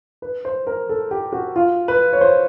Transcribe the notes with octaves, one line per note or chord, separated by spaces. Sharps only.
B4
C5
A#4
A4
G4
F#4
F4
B4
C#5
C5